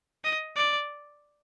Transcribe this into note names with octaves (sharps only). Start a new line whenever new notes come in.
D#5
D5